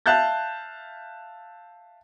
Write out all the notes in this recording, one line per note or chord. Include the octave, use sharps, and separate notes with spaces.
E5 F5 A5 F#6 G6 A6